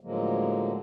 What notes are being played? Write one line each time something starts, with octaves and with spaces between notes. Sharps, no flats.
A2 D3 F3 F#3 G#3 A#3